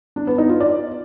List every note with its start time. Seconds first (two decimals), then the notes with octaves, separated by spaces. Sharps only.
0.16 D4
0.27 B3
0.38 D#4
0.49 F4
0.60 D5